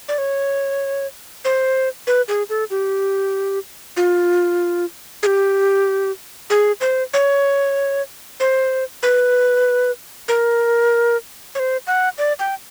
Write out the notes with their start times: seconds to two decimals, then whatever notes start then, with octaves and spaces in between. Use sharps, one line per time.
0.08 D5
0.18 C#5
1.44 C5
2.07 B4
2.28 G#4
2.49 A4
2.70 G4
3.97 F4
5.23 G#4
5.26 G4
6.50 G#4
6.81 C5
7.14 C#5
8.40 C5
9.03 B4
10.28 A#4
11.55 C#5
11.59 C5
11.87 F#5
12.18 D5
12.40 G5